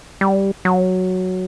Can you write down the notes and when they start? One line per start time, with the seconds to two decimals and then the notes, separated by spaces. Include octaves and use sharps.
0.21 G3
0.65 F#3